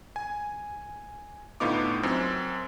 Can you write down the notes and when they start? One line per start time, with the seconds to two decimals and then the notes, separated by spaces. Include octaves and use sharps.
0.16 G#5
1.60 A2 D3 B3 D#4 F4 D6
2.03 F#2 C4